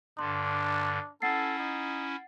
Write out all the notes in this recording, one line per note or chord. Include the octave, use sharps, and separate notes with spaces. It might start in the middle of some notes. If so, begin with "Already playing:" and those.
G2 D3 D4 C6
C#4 E4 A4 F#5 A6 C7
D#4